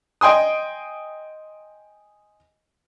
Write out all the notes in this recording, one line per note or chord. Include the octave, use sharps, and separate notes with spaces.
D#5 G5 G#5 C6 D#6